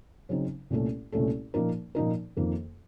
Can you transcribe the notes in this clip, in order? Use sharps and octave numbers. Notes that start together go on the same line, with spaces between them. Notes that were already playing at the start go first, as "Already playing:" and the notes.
C#3 F#3 C4 D#4
C2 A#2 A3 C#4 A4
C2 A#2 A3 C#4 A4
A#2 F3 A#3 D#4 A#4
A#2 F3 A#3 D#4 A#4
F2 D#3 A#3